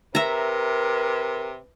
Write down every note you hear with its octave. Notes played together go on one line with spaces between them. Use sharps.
C3 A#4 B4 E5 A#5